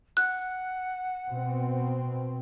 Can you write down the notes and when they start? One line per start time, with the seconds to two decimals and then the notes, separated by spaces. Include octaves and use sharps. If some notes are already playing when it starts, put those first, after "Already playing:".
0.17 F#5 F#6
1.29 B2 C4